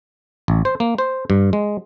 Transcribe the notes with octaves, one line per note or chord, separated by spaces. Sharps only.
A1
C5
A#3
C5
G2
G#3